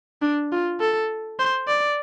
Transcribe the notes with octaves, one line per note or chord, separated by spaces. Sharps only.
D4
F4
A4
C5
D5